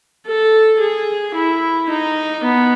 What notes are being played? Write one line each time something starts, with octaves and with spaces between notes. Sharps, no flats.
A4
G#4
E4
D#4
B3